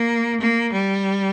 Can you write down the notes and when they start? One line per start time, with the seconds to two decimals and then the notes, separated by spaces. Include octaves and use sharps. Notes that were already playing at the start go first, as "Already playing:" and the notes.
Already playing: A#3
0.41 A#3
0.73 G3